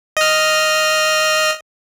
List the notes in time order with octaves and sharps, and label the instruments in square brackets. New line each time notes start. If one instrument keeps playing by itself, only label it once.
[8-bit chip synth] D#5 F6